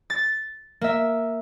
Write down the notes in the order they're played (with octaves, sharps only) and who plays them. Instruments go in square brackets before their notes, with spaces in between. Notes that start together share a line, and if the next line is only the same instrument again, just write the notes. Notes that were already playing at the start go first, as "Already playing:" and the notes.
[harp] A6
A#3 E5